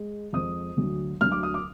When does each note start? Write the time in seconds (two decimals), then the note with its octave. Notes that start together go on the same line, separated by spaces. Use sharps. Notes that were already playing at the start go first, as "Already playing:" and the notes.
Already playing: G#3
0.33 F2 F3 G#3 D#6
0.77 D2 D3 F#3
1.21 D2 D3 F#3 F6
1.32 D6
1.43 D#6
1.54 D6